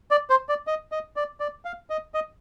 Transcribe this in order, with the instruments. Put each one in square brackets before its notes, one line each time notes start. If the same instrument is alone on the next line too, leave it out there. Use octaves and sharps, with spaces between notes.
[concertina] D5
C5
D5
D#5
D#5
D5
D5
F5
D#5
D#5